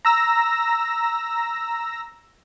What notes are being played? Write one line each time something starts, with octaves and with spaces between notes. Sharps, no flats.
A#5 E6 A#6